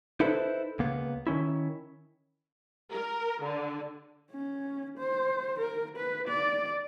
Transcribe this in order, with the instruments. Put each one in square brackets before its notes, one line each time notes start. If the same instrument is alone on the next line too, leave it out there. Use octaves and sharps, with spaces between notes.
[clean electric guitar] D#4 E4 A4 B4 C5
C#2 A#3 B3
D#3 C#4 E4
[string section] A#4
D3
[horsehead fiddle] C#4
C5
A#4
B4
D5